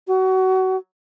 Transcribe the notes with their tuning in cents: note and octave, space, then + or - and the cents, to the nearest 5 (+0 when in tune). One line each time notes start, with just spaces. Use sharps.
F#4 +25